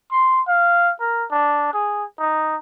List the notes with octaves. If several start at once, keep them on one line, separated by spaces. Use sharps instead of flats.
C6
F5
A#4
D4
G#4
D#4